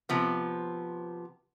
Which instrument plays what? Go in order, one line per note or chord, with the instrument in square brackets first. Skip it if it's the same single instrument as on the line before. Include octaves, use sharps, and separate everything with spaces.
[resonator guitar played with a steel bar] C3 F3 B3